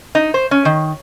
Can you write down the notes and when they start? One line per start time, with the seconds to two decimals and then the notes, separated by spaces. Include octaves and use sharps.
0.15 D#4
0.34 C5
0.51 C#4
0.65 D#3